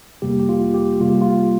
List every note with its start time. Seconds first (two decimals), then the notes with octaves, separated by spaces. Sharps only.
0.22 F2 C3 G3 A#3 G4
0.39 G4
0.49 F4
0.74 G4
1.00 C3 G3 A#3 F4
1.10 G4
1.22 F4